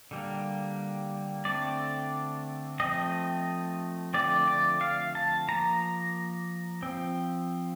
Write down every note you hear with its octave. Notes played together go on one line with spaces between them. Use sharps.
D3 G3 A#3
D3 A3 C4 D5
F3 A3 C4 D#5
D3 F3 A3 C4 D5
D5
F5
A5
F3 A#3 A#5
F3 C4